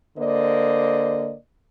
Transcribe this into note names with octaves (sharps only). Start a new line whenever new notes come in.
D3 A#3 C5 D5 D#5